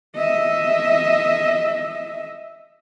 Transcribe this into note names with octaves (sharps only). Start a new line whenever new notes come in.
D#5 E5